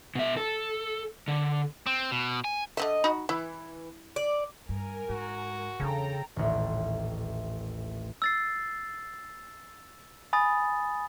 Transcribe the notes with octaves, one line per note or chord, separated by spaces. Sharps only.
B2 E5
A4
D3
C4
B2
G#5
D3 C4 D#5 E5
D#4 F#4 B5
E3 E4
D5
G2 A#4 G#5
G#2 F#4
E2 C#3 D4 A4 G5 A#5
D#1 A1
E6 A6 C7
G#5 B5 D#6 A6